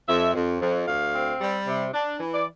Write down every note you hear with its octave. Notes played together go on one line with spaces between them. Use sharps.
F2 E5
F2
F2
D2 F5
C4
G3
C3
D4
E3
D5